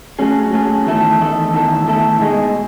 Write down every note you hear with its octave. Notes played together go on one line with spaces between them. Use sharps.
F#3 A3 C#4 G#4
F#3 A3 C#4 G#4
E2 D#3 A3 E4 A4
E2 D#3 A3 E4 A4
E2 D#3 A3 E4 A4
E2 D#3 A3 E4 A4
B2 G#3 D#4 G#4